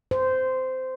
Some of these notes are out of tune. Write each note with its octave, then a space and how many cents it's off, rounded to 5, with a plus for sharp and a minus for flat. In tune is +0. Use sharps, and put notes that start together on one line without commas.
C5 -15